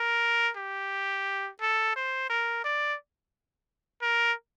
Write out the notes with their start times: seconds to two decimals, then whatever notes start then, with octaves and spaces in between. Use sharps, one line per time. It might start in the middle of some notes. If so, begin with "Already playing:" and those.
Already playing: A#4
0.57 G4
1.61 A4
1.96 C5
2.29 A#4
2.64 D5
4.02 A#4